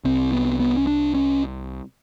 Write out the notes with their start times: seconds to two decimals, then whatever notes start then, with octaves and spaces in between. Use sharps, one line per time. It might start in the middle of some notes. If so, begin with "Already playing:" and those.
0.05 C2 C3 C4
0.32 B3
0.60 B3
0.77 C#4
0.87 D4
1.14 C#4